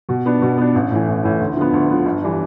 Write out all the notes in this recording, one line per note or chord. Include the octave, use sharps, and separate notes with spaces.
B2
B3 D4
B2
B3 D4
A1
A2 E3
A1
A2 E3
D2
D3 F3 B3
D2
D3 F3 B3
G1
E3 G3 D4